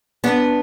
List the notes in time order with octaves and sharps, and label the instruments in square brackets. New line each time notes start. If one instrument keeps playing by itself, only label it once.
[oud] B3 D4